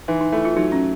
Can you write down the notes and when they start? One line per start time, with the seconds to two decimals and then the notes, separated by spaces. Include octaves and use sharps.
0.08 E3 D#4
0.21 D#4
0.32 A3 E4
0.45 F4
0.56 F#3 D#4
0.72 C#4